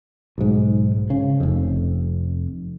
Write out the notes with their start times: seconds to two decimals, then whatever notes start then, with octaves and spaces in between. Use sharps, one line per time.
0.38 B1 G#2
1.10 C#3
1.40 F1 F2